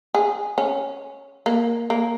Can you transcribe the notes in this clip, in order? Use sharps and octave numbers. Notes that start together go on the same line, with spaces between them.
G#4
C#4
A#3
A#3